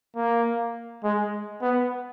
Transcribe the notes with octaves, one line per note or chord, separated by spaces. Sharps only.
A#3
G#3
B3